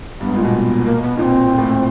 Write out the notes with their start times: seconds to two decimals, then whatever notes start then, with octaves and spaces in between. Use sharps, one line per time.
0.20 G2 B3
0.28 G#2
0.36 A#2
0.45 B2
0.85 A#3
1.02 B3
1.17 A#2 D#4
1.22 C4
1.51 A#2
1.58 A2